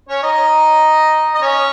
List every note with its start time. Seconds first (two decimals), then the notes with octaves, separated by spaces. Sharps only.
0.09 C#4 C#5
0.23 D#4 D#5
1.35 D#5
1.41 C#4 C#5